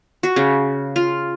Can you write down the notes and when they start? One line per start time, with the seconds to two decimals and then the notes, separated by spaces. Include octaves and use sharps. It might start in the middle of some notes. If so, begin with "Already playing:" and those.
0.23 F#4
0.36 C#3
0.96 F4